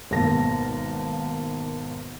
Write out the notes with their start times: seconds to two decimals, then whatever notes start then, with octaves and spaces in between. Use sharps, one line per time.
0.11 G#1 B2 A#3 A5 A#6